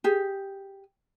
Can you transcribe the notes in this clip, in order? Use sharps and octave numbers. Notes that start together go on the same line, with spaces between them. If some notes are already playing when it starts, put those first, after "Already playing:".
G4 G#4